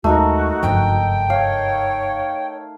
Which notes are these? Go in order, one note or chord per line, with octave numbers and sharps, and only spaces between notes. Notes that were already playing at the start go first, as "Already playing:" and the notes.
D#2 G#3 A3 D#4 F#4 A#4
F#1 G2 F3 G5
C#5 F5